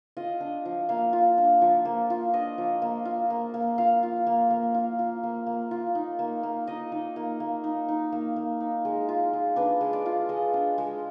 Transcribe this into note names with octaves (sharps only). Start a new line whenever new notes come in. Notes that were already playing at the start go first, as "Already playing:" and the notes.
F4 D#5
D4
F3
A#3 F5
F4
D4
F3
A#3
F4
D4 D#5
F3
A#3
F4
A#3
A#3
F4 F5
F4
A#3
A#3
F4
F4
A#3
A#3
F4
D#4
A#3
A#3
D#4 D#5
D#4
A#3
A#3
D#4
D#4
A#3
A#3
D#4
G#3
F4
G#3
D4 B4
G#3
D5
F4
G#3 D#5
D4
G#3